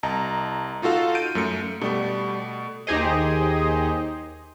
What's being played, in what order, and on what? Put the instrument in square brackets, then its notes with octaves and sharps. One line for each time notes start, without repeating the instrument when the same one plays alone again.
[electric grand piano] C2 D#5 A5 A#5
D#4 F4 F#4 A4 F5
G6 D7 D#7
F#2 A3 C#7
[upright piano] B2 A3 [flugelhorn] G3
[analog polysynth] D#2 D#4 G4 G#4 C5 D#5